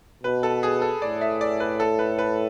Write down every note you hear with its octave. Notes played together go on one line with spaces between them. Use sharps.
B2 B4
A4
G#4
A4
A2 D5
E5
D5
B4
A4
B4
B4